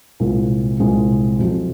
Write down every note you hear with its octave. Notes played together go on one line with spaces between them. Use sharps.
C2 A#2 G#3 C4
C2 A#2 G#3 C4
F2 C3 F#3